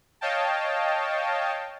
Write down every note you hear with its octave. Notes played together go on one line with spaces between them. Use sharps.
C#5 D#5 F5 G5 A5